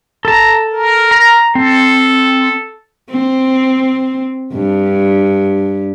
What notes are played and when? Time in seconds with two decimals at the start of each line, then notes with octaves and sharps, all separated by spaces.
0.25 A4 A5 A#5
0.73 A#4
1.11 A#5
1.55 C4 A4
3.11 C4
4.53 G2